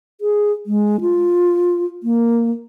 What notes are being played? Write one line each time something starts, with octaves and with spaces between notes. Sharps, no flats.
G#4
G#3
F4
A#3